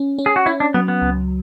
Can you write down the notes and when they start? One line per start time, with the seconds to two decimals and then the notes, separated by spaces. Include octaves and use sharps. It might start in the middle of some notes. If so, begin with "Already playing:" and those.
Already playing: C#4
0.19 C#4
0.26 G#4
0.36 F#4
0.46 C#4 E4
0.60 D4
0.74 F#3 B3
0.88 B3
1.02 C#2